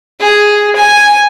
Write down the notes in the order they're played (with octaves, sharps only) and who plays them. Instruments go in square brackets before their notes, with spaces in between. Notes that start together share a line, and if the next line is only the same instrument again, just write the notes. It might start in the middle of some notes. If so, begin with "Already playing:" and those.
[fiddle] G#4
G#5